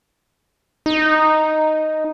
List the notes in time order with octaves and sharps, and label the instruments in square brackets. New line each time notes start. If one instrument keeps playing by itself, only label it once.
[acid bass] D#4